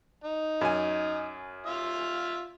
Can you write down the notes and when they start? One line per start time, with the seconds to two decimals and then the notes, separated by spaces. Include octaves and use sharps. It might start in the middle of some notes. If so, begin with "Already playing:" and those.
0.24 D#4
0.61 F#2 G#5
1.66 F4 E5 F5